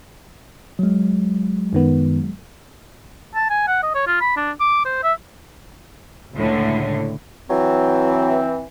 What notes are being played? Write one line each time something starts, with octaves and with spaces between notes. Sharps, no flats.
F#3 G#3
F#2 D#3 B3
A5
G#5
F#5
D#5
C#5
F4
B5
D4
D6
C5
E5
C#2 A2 D3
E3 F#3 C4